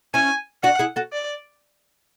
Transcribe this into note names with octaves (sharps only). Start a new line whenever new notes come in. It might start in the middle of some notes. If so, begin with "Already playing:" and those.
C#4 E4 G#5
D4 F#4 F#5
E4 G#4
F#4 A4
D5